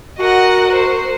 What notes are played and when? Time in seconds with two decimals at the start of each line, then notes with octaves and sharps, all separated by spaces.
0.19 F#4 A#4 D#5 F#5
0.72 C5